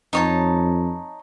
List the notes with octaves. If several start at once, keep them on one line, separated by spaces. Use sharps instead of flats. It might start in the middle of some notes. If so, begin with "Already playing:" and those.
F2 D#4 C#5 A5